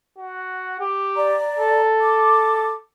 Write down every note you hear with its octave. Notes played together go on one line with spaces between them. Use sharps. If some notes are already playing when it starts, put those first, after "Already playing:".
F#4
G4
D5 A#5
A4
D6